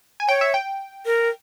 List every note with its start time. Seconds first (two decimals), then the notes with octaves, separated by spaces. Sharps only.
0.20 G#5
0.28 C#5 G5
0.41 E5
0.54 G5
1.06 A#4